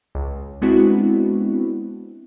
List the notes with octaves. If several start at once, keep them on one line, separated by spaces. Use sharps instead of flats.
C#2
G#3 B3 C4 D4 E4 F#4